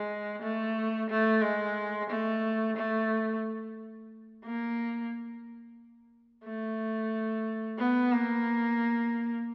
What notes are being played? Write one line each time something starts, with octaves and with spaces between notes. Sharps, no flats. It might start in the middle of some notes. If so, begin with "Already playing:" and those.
Already playing: G#3
A3
A3
G#3
A3
A3
A#3
A3
B3
A#3